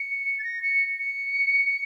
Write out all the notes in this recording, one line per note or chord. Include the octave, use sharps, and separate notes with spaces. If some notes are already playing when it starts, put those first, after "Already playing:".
Already playing: C#7
A6
A#6
C#7
C#7